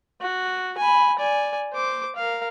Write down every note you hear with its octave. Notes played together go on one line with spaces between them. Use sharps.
F#4
G#5 B5
D5 G#5
C5 D6
A#4 F5